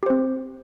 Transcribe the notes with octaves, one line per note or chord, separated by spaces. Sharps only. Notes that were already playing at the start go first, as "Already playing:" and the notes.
C4 G4 C5